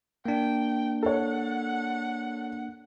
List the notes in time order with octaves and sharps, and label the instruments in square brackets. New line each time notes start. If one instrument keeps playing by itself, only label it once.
[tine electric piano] A#3 D4 [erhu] G5
[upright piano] A4 C#5 [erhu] F#5